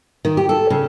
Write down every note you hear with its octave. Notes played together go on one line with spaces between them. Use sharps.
D#3
G4
A4
C#3